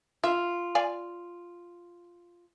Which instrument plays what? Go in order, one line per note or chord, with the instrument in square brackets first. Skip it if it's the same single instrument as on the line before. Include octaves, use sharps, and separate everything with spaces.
[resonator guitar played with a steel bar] F4 [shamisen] E5
[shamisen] D5 F5 G#5